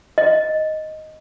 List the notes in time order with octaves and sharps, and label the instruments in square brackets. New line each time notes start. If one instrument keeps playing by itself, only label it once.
[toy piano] D#5